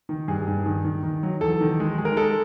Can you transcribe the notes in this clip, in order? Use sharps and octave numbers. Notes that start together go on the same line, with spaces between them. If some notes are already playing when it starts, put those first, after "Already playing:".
D#3
G2 G#4
G2
D#3
D#3
D#3
F#3
E2 A4
D#3
G#3
G#3
A#4
G#3 A4